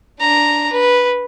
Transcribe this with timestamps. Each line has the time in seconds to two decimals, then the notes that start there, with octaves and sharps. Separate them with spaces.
0.20 D4 A#5
0.72 B4